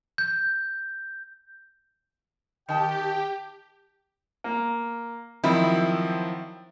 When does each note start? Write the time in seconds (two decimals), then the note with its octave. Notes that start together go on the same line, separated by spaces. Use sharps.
0.18 G6
2.69 D#3 G4 G5 A5
4.44 A#3
5.44 D#3 F3 F#3 C4 E4